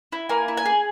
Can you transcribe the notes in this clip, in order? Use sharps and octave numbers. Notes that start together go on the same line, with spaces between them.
E4
A#3 G#5
E4
G#5
G#4